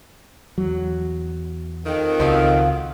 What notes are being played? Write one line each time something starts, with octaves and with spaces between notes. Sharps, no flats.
E2 F#3
F2 D#3
C#2 F3 F#3 F5